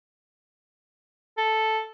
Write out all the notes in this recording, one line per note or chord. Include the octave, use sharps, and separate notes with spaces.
A4